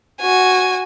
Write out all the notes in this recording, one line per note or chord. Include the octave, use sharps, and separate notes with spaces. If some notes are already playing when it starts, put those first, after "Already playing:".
F#4 G#5